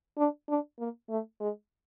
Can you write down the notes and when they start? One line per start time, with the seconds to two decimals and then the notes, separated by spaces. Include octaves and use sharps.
0.18 D4
0.49 D4
0.79 A#3
1.10 A3
1.40 G#3